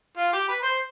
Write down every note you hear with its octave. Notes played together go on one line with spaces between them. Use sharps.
F4
G4
B4
C5